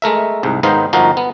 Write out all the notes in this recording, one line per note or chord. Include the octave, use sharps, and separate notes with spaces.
G#3 A3 A#4 E5
C2 G#2
G#2 D#3 B3 D#4 C5 F5
G1 F3 D#4 F#4 A#4
B3